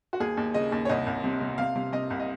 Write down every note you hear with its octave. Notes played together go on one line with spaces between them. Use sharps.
F#4
D#2 G#4
D#2
C#3 D#5
D#2
C#5
C2 D#5
C2
C3
C3
C3 F5
C3
C3 D#5
C2
D#5